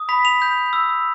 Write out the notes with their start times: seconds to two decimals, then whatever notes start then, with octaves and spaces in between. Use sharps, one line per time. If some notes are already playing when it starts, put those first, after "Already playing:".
Already playing: D#6
0.09 B5 B6
0.25 F7
0.42 G6
0.73 E6